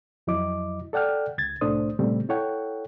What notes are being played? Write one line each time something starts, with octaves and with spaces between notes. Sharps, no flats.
F2 F#3 E4 D#5 D6
A4 D5 F#5 G5 F6
C#2 G#6 A6
C2 A2 A3 D4 C5 D#6
A#2 C#3 G3 A3 C4
E4 A4 C#5 F#5 G5